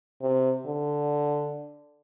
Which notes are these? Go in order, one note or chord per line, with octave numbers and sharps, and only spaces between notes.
C3
D3